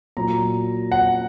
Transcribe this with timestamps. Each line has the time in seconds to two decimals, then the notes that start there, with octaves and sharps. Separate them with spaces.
0.17 A#2 F#3 A#5
0.92 F#5